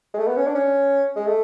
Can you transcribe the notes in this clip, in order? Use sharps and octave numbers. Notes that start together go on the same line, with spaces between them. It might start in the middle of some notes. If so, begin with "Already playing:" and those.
G#3
A3
B3
C#4
D4
C#4
G#3
A3